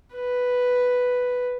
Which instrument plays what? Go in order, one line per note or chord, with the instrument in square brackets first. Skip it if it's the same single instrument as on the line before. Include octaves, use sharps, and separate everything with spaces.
[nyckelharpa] B4